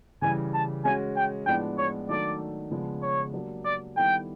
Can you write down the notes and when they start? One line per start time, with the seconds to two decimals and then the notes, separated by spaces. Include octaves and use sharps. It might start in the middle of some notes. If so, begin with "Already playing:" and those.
0.22 C#3 E3 G3 G#5
0.54 A5
0.84 G#3 C#4 F#4 G#5
1.16 G5
1.46 A2 F3 G#3 B3 D4 G5
1.78 C#5
2.09 D#3 F#3 A3 D4 D5
2.71 C#3 F3 G#3 B3 D4
3.03 C#5
3.33 F#3 A#3 D4 G4
3.65 D5
3.96 D#3 G3 B3 E4 A4 G5